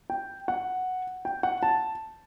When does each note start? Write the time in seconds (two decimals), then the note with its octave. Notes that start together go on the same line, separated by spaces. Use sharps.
0.10 G5
0.48 F#5
1.25 G5
1.43 F#5
1.63 A5